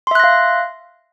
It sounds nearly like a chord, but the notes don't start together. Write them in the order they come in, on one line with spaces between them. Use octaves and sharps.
C6 E5 F#6 A#6 F5